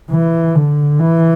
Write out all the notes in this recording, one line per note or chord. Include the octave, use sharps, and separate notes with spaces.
E3
D3
E3